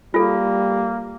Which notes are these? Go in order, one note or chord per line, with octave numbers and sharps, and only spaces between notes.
G3 A#3 F4 A4